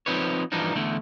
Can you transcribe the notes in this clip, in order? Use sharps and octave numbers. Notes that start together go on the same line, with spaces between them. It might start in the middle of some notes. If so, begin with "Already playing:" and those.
F3 C4 D#4 B4 C#5
G2 E3 F3 D4 D#4
E2 D3 A3